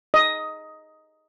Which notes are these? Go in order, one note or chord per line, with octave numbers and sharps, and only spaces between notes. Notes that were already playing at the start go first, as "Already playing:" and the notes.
D#5